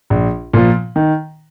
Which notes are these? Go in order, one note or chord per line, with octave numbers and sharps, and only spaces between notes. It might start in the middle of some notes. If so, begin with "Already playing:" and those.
A#1
A#2 F3
D#3